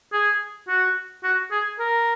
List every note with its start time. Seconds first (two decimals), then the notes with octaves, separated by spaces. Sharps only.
0.12 G#4
0.68 F#4
1.24 F#4
1.51 G#4
1.79 A#4